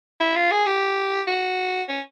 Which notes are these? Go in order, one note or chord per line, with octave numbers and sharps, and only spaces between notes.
E4
F4
G#4
G4
F#4
C#4